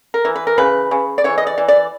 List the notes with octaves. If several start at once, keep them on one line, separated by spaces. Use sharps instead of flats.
A#4
E3
B4
A#4
C#3 B4
C#3
D5
E3 C#5
D#5
D5
E3
D5